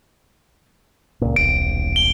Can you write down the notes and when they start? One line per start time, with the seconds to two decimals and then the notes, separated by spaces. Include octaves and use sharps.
1.21 C#2 A#2
1.36 D#1 B1 D7
1.96 G7